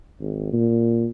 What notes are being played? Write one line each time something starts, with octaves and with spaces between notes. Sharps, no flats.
G#1
A#2